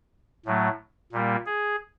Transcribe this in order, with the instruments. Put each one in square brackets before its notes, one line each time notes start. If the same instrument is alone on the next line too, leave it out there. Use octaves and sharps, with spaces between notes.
[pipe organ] A2 F#3 A3
A#2 G3 A#3
G#4